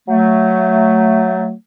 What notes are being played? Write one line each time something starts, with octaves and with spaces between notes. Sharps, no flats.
F#3 A3